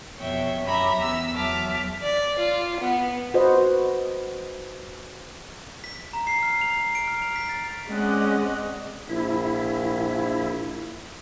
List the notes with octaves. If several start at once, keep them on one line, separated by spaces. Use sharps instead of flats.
F2 B2 C#5 E5 G5
F#2 C#4 G4 E5 A#5 B5
E2 B3 E6
E2 F#3 E5 A5 D6 F6
D5
F4
B3
F#4 B4 C5 D#5
B6
A#5
C7
F6
F7
D7
F6
F7
B6
A6
G#3 C4 C#4 D5 D#5 F#5
A#1 E4